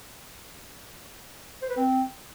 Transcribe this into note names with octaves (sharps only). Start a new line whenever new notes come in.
C5
B4
C4